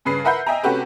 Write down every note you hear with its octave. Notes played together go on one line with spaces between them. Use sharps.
G2 C#3 B4 C7
A#4 B4 E5 F#5 B5 G6
D#5 E5 G5 G#5 A#5
C3 A3 C#4 F#4 G4 B4